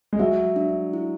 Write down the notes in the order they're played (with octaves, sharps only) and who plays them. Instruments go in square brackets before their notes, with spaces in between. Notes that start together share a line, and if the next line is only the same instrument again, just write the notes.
[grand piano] G#3
[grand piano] F#3 [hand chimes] E5
[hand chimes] D4
E4